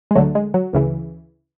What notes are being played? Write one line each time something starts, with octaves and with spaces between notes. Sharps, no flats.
G#3
D2 D3 F#3 A3
G#3
F#3
D2 C#3 E3